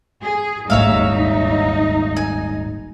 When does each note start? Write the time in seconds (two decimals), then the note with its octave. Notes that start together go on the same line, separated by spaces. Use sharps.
0.23 G#4
0.70 D#1 G#1 D2 D#4 C#5 E5 F5
2.17 G#5